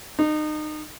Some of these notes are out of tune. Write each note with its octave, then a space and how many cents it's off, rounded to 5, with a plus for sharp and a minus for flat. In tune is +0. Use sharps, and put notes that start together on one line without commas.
D#4 -30